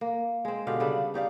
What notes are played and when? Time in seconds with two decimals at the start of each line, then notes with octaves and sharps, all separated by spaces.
0.01 A#3
0.45 G#3 C4
0.67 B2 D3 G4 F5
0.80 C#3 G3 D4 B4
1.14 D#4 G4 D5 F5